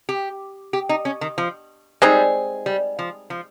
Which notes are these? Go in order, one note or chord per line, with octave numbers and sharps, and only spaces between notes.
G4
G4
D#4
C#4
D#3
F3
G3 G#3 C4 D#4 G#4
G3
F3
F3